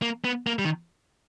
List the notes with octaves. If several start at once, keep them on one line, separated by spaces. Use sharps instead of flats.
A#3
B3
A#3
G3
D#3